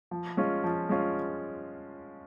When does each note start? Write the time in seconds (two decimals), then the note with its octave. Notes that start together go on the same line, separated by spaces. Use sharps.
0.11 F3
0.37 G#3 C#4 F4
0.64 F3
0.89 G#3 C#4 F4